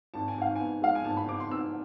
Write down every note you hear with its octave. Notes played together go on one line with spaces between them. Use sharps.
G#1 A5
G#5
G#2 F5
B3 G#5
G#3 F5
G#5
G#1 A5
B5
G#2 D6
C6
B3 E6